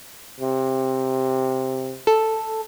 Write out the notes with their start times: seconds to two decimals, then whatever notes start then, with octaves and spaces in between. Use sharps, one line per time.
0.40 C3
2.07 A4